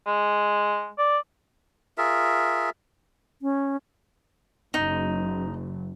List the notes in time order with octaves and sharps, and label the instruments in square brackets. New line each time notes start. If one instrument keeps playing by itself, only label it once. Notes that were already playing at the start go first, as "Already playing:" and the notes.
[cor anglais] G#3
D5
[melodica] F4 G#4 A#4 E5
[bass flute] C#4
[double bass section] F#1 [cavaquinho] D#4